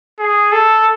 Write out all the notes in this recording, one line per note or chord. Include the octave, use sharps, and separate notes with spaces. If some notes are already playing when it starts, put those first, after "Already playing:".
G#4
A4